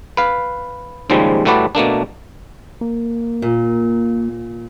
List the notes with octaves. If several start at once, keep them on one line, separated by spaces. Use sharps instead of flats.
B4 F5
D#2 G#2 C#3 F3 G3 G#3
A2 G3 A3 F#4 B4 D5
B2 A3 A#3 D4
A#3
A#2